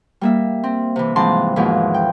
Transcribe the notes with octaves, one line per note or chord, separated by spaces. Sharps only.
G3 A#3 E5
C4
C3 E3
G#2 E3 F3 C4 A5 C6
D#2 G#2 B2 E3 F3
G5